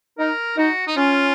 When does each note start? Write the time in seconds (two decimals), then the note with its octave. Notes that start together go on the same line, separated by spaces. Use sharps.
0.18 D#4 A#4
0.57 D#4 F#4
0.87 D#4
0.96 C#4 F4